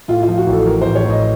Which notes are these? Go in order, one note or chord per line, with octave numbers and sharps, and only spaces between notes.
A2 F4
F4
F3
F#4
A1
A4
A1 A#4
A1 C5
C#5
A1
D#5